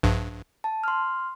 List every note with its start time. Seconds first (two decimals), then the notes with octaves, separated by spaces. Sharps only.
0.03 A#1 G2
0.64 A5
0.84 C6 F6